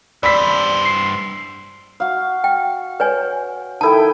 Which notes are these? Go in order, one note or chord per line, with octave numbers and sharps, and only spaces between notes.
G2 C5 D5 B5 E6 B6
C7
F#4 F5
G5
B4 C#5 G#5
D#3 E4 A4 G5 A5